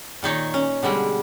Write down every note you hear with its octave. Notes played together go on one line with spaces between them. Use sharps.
A#2 D#3 D#4 C#5
C#4
B2 D3 G3 G#3